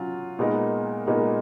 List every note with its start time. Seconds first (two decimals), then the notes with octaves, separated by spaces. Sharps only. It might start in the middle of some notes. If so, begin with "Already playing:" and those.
Already playing: F#3 C#4 F4
0.39 A#2 G#3 B3 D#4 A#4
1.06 A#2 G#3 B3 D#4 A#4